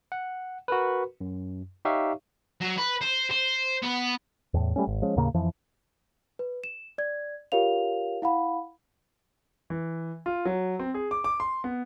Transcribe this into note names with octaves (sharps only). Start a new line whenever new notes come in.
F#5
F#4 A#4 B4
F#2
D#4 G4 C#5 E5 F5 C#6
F#3
B4
C5
C5
B3
E2 A2
G3 A3 C#4
G#1
F3 G#3 C#4
D#2 A2 C#3 A#3
F2 E3 F3
B4
E7
D5 G#6
F4 G4 A#4 C#5 F5 F7
E4 F5 F#5 B5
E3
F4
F#3
C4
G#4
D6
D6
C6
B3